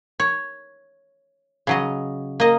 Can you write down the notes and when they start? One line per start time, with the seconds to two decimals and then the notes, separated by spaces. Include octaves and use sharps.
0.20 C#5
1.67 C#3 F#3 D#5
2.40 A#3 D#5